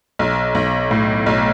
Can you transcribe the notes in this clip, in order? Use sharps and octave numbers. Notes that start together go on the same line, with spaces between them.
B1
B1
A2
B1